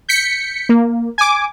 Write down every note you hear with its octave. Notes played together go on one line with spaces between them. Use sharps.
G6 B6 C#7
A#3
G#5 D6